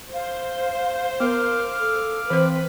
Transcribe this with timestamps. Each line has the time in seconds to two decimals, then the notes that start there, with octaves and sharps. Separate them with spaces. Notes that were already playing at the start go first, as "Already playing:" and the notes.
0.14 C5 F5
1.20 B3 A#4 F5 D6 F6
1.80 A4
2.30 E3 C4 B4 C5